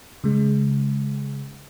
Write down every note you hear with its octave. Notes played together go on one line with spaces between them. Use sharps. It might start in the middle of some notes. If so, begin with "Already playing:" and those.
C#3 G#3